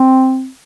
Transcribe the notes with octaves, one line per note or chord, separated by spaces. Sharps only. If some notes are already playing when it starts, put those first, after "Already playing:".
Already playing: C4